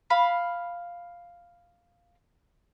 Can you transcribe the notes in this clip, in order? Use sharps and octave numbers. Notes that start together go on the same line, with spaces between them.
F5 B5